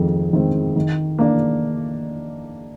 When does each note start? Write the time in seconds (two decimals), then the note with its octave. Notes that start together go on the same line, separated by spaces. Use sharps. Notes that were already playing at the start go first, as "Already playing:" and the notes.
Already playing: F2 D#3 G#3 C4
0.33 D#3 G#3 C4
0.76 D#3
1.19 A#3 D4